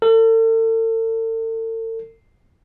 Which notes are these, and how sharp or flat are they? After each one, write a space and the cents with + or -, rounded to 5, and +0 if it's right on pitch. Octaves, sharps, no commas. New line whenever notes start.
A4 +40